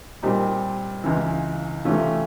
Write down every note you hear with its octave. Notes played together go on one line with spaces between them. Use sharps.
A#2 G3 C4 D#4
C#2 C#3 E3
C3 E3 A3 C#4 F4